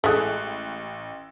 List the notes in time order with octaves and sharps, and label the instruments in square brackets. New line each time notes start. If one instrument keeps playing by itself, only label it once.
[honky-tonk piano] A1 F#6 [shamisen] G#3 A3